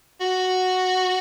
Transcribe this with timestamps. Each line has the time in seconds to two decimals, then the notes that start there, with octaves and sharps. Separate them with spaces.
0.21 F#4